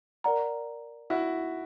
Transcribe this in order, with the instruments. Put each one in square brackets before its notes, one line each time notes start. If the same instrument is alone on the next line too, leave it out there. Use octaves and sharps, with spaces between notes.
[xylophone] A#4 D5 F#5 A#5
[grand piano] E4 F#4